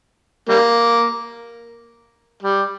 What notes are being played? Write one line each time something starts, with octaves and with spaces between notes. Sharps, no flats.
G3 A#3
G3